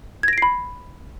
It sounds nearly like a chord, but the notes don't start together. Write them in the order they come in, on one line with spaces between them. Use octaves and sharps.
G#6 A#6 D7 C7 B5